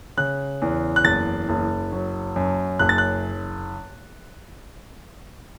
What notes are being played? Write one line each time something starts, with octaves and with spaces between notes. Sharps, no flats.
C#3 F#6
E2
F#6
F#1 A6
F#1
F#3
F#2
F#1 F#6
A6
F#6